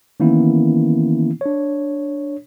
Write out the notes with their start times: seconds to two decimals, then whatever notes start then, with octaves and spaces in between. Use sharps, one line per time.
0.20 D#3 E3 A#3 B3 C#4 E4
1.41 D4 C#5